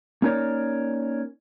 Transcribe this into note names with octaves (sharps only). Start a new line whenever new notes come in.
A#3 C#4 D#4 A#4 C#5 D5